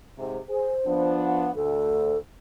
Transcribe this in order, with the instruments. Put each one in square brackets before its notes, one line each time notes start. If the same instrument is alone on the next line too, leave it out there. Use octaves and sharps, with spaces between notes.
[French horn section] G#2 C3
[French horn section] G#4 [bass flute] C5
[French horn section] F3 B3 D4
[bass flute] F#5
[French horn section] D2 [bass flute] A4